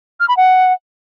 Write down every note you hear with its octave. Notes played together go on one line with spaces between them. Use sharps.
F6
B5
F#5